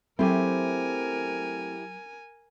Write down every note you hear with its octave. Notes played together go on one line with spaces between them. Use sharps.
F#3 A3 C4 E4 G4 A#4 G#5